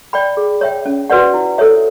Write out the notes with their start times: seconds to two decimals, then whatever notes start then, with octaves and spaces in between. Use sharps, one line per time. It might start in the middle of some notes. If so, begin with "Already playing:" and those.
0.13 D5 G5 B5
0.37 G#4
0.61 C#5 E5 G5
0.86 C#4
1.10 F#4 B4 D5 F#5
1.34 E4
1.58 A4 C#5 E5